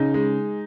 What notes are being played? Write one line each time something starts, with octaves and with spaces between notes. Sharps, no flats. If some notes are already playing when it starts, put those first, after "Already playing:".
Already playing: C#3 D#4
G#3